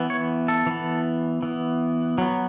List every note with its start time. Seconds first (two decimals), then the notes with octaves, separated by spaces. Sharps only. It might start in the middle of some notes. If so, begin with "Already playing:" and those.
Already playing: E3 B3
0.10 C#5
0.48 A4
0.66 E3 B3
1.43 E3 B3
2.18 F#3 B3